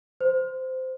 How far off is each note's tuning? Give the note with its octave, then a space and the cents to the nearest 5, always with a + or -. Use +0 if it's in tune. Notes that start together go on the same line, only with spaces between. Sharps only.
C5 -15